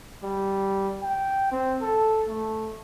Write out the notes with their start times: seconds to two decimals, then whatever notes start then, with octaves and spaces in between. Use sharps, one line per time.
0.23 G3
1.02 G5
1.51 C4
1.82 A4
2.28 A3